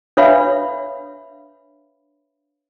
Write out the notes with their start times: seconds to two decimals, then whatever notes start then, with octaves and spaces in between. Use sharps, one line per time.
0.17 D4 B4 C#5 E5 F5 B5